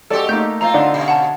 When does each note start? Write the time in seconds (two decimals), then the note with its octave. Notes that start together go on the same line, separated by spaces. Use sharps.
0.10 G#3 F#4 G4 A4 D5
0.29 A3 A#3 D#4 G6
0.61 A2 C4 F4 A#5
0.74 D3 D4 D#4 F#5
0.94 B2 C#4
1.08 F#5 A5